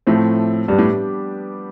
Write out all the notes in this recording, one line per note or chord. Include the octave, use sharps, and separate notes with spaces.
A2 F3 A3 C4
G2 G3 B3 D4 G4
A2